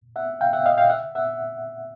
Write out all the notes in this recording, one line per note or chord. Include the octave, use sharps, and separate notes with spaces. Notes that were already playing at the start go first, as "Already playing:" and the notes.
E5 F#5
F5 G5
E5 F#5
D#5 F5
F5 G5
E5 F#5
E5 F#5